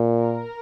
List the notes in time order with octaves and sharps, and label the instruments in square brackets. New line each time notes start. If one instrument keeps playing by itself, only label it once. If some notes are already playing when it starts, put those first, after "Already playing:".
Already playing: [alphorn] A#2
[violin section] A#4